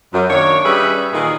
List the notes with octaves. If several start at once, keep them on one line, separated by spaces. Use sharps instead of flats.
F#2
D#3 A#3 D4 C#5
G3 C#4 G#4 B4 D#5 E5
A#2 D#3 E3 G#4